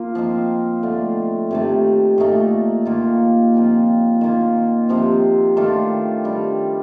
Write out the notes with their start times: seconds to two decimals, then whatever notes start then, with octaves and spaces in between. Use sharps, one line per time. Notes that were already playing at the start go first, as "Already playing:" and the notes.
Already playing: A#3 F4
0.15 F3 C4 D#4
0.83 D3 A3 D4
1.51 C3 D#3 A3
2.18 A#2 A3 D#4
2.85 D#3 A#3 F4
3.54 A#2 F3 C4 F4
4.21 D#3 A#3 F4
4.89 C3 F3 C4
5.57 D#3 A3 D4 F4
6.24 D#3 G3 D4